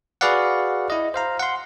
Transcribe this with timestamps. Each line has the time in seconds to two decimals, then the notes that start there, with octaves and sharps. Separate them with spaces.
0.21 F#4 G#4 B4 D5 F5 F#5
0.90 E4 D#5
1.14 C5 F5 A#5
1.39 F#5 C6